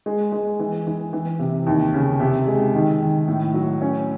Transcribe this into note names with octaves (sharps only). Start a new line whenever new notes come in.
G#3
G#3
E3
E3
E3
C3
D#2
C#3
C3
G#3
D#3
D#3
A2
F#3
C#4